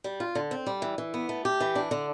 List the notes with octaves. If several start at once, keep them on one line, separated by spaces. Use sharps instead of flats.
G3
F4
D3
C4
G3
E3
E3
B3
A3
G4
E3
D4
D3